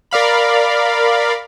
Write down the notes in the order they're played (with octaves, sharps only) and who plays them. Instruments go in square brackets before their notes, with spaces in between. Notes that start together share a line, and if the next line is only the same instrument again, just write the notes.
[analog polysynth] A#4 D5 F5 B5